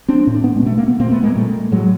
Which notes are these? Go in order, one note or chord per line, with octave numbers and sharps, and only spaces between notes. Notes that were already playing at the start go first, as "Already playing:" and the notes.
C4 D4
A2 C#4
D4
B3 C#4
G#3
B2 A3
A#3
B3
A#2 A#3 C4
A3 B3
G#3 A#3
A#2 G3 A3
A2 F#3 G#3